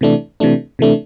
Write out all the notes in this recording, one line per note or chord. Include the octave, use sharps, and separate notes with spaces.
C3 E3 A3 D4
C3 E3 A3 D4
C3 E3 A3 D4